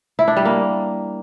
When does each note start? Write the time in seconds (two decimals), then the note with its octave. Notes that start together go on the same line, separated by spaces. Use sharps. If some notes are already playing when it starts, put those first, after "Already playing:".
0.19 E4
0.28 D4
0.37 G3
0.45 A#3